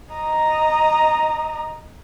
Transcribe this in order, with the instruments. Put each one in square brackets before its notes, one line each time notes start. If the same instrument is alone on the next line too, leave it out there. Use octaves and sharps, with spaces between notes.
[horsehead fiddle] D#5 A#5